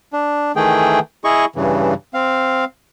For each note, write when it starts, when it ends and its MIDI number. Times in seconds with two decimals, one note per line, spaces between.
0.13 0.52 62
0.56 1.00 51
0.56 1.00 52
0.56 1.00 57
0.56 1.00 68
0.56 1.00 79
1.24 1.45 64
1.24 1.45 68
1.24 1.45 75
1.24 1.45 85
1.56 1.94 43
1.56 1.94 49
1.56 1.94 52
2.14 2.65 60
2.14 2.65 77